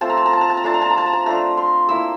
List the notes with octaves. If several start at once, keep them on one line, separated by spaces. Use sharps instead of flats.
A3 C4 F4 A5
A#5
A5
A#5
A5
A#5
A5
A#5
A3 D4 F4 A5
A#5
A5
A#5
A5
A#5
A5
A3 D4 F4 A#5
C6
A#3 E4 E6